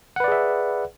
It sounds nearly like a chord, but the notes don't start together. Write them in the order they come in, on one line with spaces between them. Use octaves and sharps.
F#5 B4 D5 G#4 E5